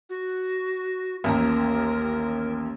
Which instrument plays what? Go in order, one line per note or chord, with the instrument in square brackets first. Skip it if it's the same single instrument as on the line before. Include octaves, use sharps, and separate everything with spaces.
[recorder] F#4
[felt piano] A1 D#2 A#5 [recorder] A#4